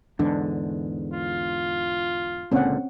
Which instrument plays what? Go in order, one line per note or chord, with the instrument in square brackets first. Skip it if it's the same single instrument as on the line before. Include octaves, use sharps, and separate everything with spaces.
[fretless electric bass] E2 G#2 D3 [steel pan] D4
[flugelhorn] F4
[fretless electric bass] C#2 A#2 D3 [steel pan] C4 C#4 F#5